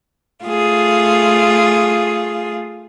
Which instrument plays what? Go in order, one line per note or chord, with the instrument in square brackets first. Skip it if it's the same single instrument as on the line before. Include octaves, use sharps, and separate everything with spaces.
[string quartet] A3 F4 G#4